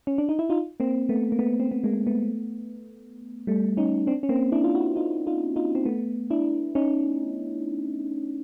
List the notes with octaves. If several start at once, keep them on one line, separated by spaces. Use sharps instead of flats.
C#4
D4
D#4
E4
D#4 F4
A#3 C4
A3 B3
A#3
A3 B3
C4
B3
G#3 A#3
A3 B3
G3 A3
C#4 D#4
C4 D4
C#4
A#3 C4
D4 E4
F4
E4 F#4
D#4 F4
D#4 F4
D#4 F4
C4
A3 B3
D4 E4
C#4 D#4